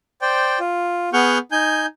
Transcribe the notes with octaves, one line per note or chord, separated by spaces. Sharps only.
C5 D5 G5
F4
B3 G#4 F#5 C#6 F6 G6
D#4 G#5 G6